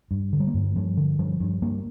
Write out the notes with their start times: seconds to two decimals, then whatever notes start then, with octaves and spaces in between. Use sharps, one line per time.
0.11 G2
0.33 D3
0.40 G3
0.47 A#3
0.54 G2
0.75 G2 F3
0.97 D3
1.19 G2 F3
1.40 G2
1.62 G2 A#3